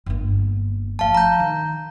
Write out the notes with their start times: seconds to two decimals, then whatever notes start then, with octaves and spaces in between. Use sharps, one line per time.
0.06 G1 A#3
0.99 F3 A3 F5 A5
1.15 A#5 G6
1.40 D#3